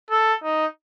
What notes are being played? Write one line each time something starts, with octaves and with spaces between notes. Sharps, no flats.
A4
D#4